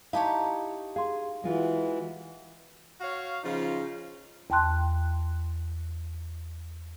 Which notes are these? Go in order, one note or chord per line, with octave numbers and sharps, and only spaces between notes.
D#4 E4 G4 C#5 F5 A5
G#4 F5 C6
E3 G#3 F4 F#4
F#4 C#5 F5
C#3 F3 D#4 F4
E2 G5 A5 C6 F#6